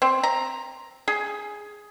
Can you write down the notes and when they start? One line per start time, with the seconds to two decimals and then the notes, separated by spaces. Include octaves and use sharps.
0.02 C4
0.23 A#5
1.08 G#4